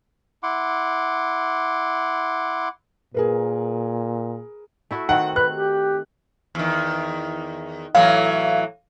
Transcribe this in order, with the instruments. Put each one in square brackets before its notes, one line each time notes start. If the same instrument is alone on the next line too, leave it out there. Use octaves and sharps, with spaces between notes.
[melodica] E4 F#5 C6 D6
[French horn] A#2 [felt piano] G#4 A#4 B4
[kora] A3 E4 F#4
[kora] D#3 C4 F#4 [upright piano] F#5
[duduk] B4 [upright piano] F#6
[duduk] G4
[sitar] E2 D#3
[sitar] A2 E3 F#3 [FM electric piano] F5